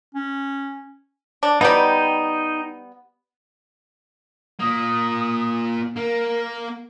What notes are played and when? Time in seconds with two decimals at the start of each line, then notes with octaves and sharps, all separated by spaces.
0.15 C#4
1.43 D4
1.61 G3 B3 D#4 G5
4.60 A#2 A#3 D#6
5.96 A#3 A#4